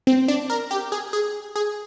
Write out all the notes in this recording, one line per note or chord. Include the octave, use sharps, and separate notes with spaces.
C4
D4
A#4
G4
G#4
G#4
G#4